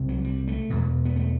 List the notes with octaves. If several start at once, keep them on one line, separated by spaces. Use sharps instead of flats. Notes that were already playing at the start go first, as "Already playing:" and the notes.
Already playing: C2 C3
F#3
G3
A3
E2 B2
B3
A3